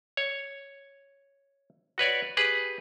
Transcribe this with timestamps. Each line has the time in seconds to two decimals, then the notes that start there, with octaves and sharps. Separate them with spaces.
0.17 C#5
1.98 F#4 B4 C#5 D5
2.37 G4 G#4 B4